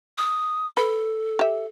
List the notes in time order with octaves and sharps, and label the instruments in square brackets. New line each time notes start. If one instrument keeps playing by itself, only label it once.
[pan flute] D#6
[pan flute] A4 [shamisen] B4
[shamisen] G4 E5